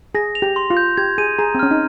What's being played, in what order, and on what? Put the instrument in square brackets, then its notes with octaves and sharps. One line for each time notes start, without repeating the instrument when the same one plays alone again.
[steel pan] G#4 [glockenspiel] A#6
[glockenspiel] F7
[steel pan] G4
[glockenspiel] C6
[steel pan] F4
[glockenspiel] G6
[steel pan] G4 [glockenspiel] G#6
[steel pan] G#4 [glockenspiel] D#7
[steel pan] G#4 [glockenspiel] A#5
[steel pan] C4
[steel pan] C#4 [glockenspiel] F6
[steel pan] D#4